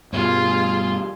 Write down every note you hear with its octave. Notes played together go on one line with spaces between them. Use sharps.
G2 B2 G3 F4 G#4